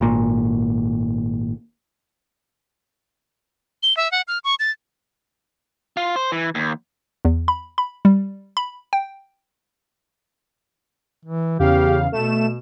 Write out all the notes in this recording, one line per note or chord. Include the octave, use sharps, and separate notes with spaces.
G#1 A#2
G7
E5
F#5
F6
C#6
A6
F4
C5
E3
D#2
E2
B5
B5
G3
B5
G5
E3
E2 C#3 G4 F5
B2 A3 E7